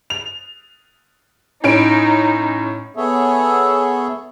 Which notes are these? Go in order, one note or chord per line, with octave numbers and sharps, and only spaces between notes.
F7
A2 C#4 D#4 D7
B3 G#4 A4 C#5 E5